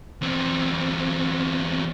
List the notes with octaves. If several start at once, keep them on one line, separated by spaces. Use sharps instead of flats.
E2 C4